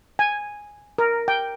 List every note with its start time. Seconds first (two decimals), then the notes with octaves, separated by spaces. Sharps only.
0.19 G#5
0.98 A#4
1.28 G5